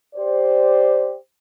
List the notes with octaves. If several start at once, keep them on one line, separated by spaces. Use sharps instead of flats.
G4 C5 D5